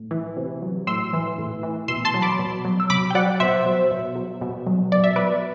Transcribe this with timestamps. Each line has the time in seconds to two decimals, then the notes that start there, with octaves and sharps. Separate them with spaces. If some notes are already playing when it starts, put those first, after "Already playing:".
Already playing: A2
0.11 E3
0.37 C3
0.62 F#3
0.87 A2 C6 E6
1.13 E3
1.38 A2
1.63 E3
1.88 B2 C6 E6
2.05 A5 C6
2.14 F#3
2.22 B5 D6
2.39 B2
2.65 F#3
2.80 E6
2.90 C3 B5 D6
3.10 G5
3.15 F#3 D5 F#5
3.40 B2 C5 E5
3.66 F#3
3.91 B2
4.16 F#3
4.41 B2
4.67 F#3
4.92 B2 D5
5.04 E5
5.16 F#3 B4 D5